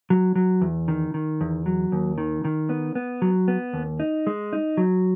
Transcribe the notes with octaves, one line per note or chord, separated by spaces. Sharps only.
F#3
F#3
E2
D#3
D#3
E2
F#3
D#2
D#3
D#3
B3
B3
F#3
B3
D#2
D#4
G#3
D#4
F#3